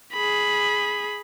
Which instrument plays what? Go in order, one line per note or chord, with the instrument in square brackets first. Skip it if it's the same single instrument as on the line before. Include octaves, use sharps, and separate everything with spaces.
[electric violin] G#4 B5